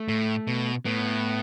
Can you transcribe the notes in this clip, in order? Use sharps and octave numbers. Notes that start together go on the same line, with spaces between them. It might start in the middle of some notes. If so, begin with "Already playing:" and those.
Already playing: A3
A2
B2
A2 B3